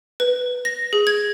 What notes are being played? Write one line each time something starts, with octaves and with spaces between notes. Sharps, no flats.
B4
A#6
G#4
G#6